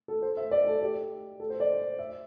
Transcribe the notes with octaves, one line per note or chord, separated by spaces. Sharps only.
A4
C5
E5
D5
A4
G4
A4
C5
D5
E5